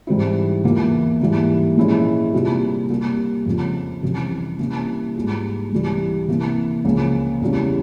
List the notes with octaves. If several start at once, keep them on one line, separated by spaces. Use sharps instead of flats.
G#2 E3 G3 C4 E4
E2 E3 A#3 F4
G#2 E3 G3 A#3
A#2 F3 G#3 C#4 E4
C3 G3 A#3 F4
C3 G3 A#3
F2 C#3 F3
F2 C3 E3 G3 C#4
C3 G3 A#3 C#4 E4
G#2 G3 A#3 F4 G#4
C2 C3 E3 G3
C3 E3 A#3
C#2 C#3 F3 A#3
E2 C#3 G3 C#4